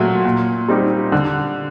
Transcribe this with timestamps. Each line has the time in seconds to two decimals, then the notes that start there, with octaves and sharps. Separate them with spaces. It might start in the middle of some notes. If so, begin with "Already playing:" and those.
Already playing: A#2 F#3 A3
0.25 A#2
0.68 G3 C4 D#4 G4
1.12 D3